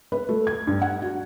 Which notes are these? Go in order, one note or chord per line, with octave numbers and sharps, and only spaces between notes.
B4
A3
G#6
G2
F#5
F#4